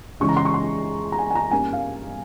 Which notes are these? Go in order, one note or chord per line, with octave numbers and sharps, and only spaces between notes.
C#3 E3 G#3 C#4 C#6
A#5
C6
C#6
C6
A#5
G#5
G#5
A#5
G2 G3 A#3 C#4 G#5
F5